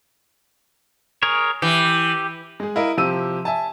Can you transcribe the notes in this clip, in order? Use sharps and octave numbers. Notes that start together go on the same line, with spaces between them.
G#4 A#4 C#5
E3 G4
G#3 G#4
E4 A#4 D#5 F5
C3 F3 G4 E6 D#7
E5 G#5 A5